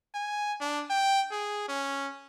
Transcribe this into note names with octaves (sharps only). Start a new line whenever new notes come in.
G#5
D4
G5
G#4
C#4